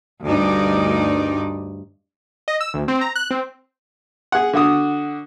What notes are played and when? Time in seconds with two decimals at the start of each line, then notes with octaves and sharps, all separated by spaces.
0.24 D2 G2 D#4 D5
2.48 D#5
2.61 E6
2.74 D2
2.88 C4
3.01 A#5
3.16 F#6
3.31 C4
4.32 G#4 F#5
4.53 D3 F#4 D#6